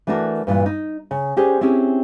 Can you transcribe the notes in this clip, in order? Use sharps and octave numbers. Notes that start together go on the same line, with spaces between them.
E3 A3 D4 F#4 A#4
G2 A#2 E3
D#4
C#3
C#4 D4 G4 G#4 C5
C4 C#4 E4 G4 G#4